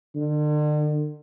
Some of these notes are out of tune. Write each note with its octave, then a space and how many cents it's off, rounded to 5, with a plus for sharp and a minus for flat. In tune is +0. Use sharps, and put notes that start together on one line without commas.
D3 +40